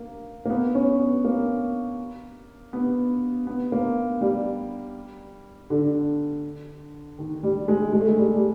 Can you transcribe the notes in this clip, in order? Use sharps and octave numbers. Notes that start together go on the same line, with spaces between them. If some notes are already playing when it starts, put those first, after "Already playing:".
Already playing: A#3
A#3
B3
C#4
B3
A#3
B3
B3
A#3
G3
D3
D#3
G3
G#3
G#3
A3
G#3
G3
G3